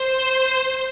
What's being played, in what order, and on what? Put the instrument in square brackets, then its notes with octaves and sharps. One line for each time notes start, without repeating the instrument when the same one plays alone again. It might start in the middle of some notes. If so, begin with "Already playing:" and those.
Already playing: [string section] C5